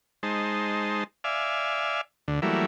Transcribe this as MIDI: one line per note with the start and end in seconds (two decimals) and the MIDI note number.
0.23 1.04 56
0.23 1.04 63
0.23 1.04 72
0.23 1.04 81
1.24 2.01 74
1.24 2.01 76
1.24 2.01 77
1.24 2.01 80
2.28 2.40 38
2.28 2.40 50
2.42 2.66 52
2.42 2.66 54
2.42 2.66 55
2.42 2.66 57
2.42 2.66 58
2.42 2.66 64